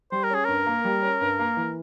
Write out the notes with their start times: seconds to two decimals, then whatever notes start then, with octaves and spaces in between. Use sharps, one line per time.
0.11 G3 C5
0.23 A#4
0.30 C#4 G#4
0.45 G2 A#4
0.66 A#3
0.85 G3
1.02 C#4
1.21 G2
1.39 A#3
1.57 E3